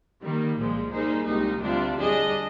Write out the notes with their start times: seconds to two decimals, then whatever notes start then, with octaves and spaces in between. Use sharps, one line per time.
0.22 D#3 G3 A#3
0.57 C2 A#2 F3 G#3
0.92 G3 A#3 D#4 G#4 C5
1.27 C2 A#2 G#3 D#4 G4
1.62 D2 C3 G3 D4 F4
1.98 G3 D4 G#4 D#5